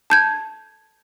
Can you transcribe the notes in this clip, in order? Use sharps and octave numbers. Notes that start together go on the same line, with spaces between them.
A5 G6 G#6